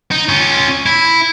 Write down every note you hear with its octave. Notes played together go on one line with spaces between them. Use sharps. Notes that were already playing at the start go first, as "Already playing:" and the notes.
D#4
C#4 F4
E4